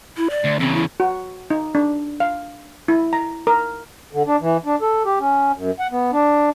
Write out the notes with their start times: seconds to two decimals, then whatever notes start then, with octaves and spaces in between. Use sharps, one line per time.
0.17 E4
0.30 D5
0.44 D2
0.59 E2 C#3 C4
0.74 E4
1.00 F#4
1.50 D#4
1.75 D4
2.20 F5
2.88 E4
3.13 A#5
3.47 A#4
4.13 D3
4.27 D4
4.41 E3
4.65 D4
4.82 A4
5.05 G4
5.20 C#4
5.56 F#2
5.80 F#5
5.91 B3
6.12 D4